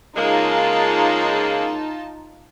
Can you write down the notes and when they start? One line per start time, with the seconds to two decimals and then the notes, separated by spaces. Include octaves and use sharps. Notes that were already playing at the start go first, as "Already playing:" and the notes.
0.17 C#3 G#3 A#3 D#4 F4 A5